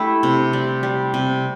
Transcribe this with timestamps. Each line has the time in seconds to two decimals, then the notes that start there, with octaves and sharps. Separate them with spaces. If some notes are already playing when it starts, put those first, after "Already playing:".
Already playing: A3 D4 E4 G4
0.23 C3
0.53 G3
0.83 G3
1.14 C3